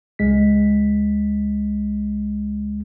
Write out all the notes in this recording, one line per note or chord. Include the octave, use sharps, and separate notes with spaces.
C#2 G#3 B6